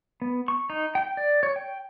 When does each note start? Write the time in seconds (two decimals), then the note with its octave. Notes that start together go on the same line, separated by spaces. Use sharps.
0.22 B3
0.48 C#6
0.70 D#4
0.95 G5
1.17 D5
1.43 C#5
1.56 G5